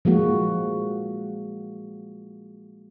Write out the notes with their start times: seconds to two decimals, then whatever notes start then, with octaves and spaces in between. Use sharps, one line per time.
0.05 F3 G#3 A#3 F#4